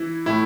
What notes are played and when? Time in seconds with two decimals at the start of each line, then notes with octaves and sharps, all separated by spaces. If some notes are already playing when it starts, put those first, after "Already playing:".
Already playing: E3 E4
0.26 A2 A3 E4